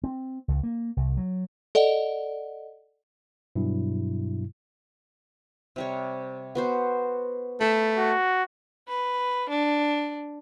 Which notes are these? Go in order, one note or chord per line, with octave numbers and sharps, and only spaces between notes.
C4
C#2
A#3
C2
F#3
A4 D5 D#5 F#5
G2 B2 F#3 E4
C3 G3 C#5
B3 F#4 C5
A3 A5 B5
F#4
B4
D4